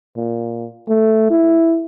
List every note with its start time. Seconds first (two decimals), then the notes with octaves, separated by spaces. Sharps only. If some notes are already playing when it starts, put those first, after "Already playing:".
0.17 A#2
0.89 A3
1.30 E4